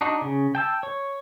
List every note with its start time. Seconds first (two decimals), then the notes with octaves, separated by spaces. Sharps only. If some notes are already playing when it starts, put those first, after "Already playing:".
0.01 D4 D#4 F#4
0.21 C#3
0.55 G5 A5 E6
0.83 C#5